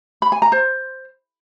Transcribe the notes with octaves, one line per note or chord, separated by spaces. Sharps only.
B5
G#5
A#5
C5